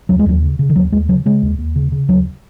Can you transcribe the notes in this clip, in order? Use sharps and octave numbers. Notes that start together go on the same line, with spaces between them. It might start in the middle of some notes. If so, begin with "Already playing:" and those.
D#2 F#3
G#3
D#2 F#3
C#3
C#3
D#3
D#2 F#3
D#2 G#3
C#3 F#3
C#3 G#3
D#2
D#2
C#3
C#3
D#2 F#3